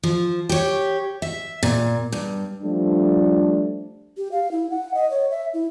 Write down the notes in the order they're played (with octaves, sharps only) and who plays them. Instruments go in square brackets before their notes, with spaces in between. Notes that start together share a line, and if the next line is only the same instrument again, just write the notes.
[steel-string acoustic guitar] F3
G4 C#5
E5
A#2
G2
[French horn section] F3 G3 A3 D4
[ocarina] G4
F5
E4
F#5
D#5
C#5
E5
E4